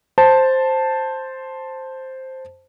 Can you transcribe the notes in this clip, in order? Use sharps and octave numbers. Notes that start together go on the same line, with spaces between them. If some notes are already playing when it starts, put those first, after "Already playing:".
C5 A5